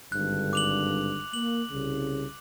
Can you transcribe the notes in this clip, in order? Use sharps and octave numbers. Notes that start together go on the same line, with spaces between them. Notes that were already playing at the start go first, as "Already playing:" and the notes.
G#1 G2 D3 F#6
D6 F7 F#7
A#3 F#7
C2 C#3